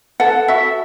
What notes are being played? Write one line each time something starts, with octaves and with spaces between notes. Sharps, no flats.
A4 F#5
F#4 E5